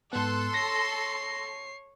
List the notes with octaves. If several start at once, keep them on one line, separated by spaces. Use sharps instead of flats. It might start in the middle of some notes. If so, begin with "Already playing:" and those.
G#2 B3 A4 C6 F#6
C#5 A#6 C7